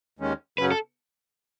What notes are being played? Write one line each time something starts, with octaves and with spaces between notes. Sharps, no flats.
D#2 D#3 G#3 C#4
F#2 C#3 F#3 C#4 B4
A4